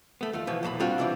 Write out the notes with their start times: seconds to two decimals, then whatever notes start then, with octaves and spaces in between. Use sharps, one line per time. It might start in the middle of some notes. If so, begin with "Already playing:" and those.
0.21 A3 B3
0.33 D#2 A3 F4
0.47 B2 E3 F3 B3
0.63 B1 E2 A#2 A5 B5
0.80 G3 C4 D4 F4 F#4
0.98 C2 C3 E3 D4 D5